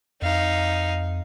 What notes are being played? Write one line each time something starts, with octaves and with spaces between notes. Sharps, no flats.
F2 D#4 F5